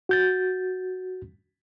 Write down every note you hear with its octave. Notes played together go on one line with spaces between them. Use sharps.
F#4 G6 A6